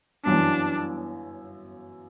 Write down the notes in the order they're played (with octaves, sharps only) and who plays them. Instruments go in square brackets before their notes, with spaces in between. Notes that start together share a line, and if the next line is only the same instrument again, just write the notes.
[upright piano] G1 F#2 E3 B3 [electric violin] D4